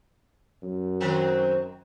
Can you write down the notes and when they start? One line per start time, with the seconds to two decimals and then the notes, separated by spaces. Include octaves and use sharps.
0.62 F#2
1.00 D#3 F#3 C4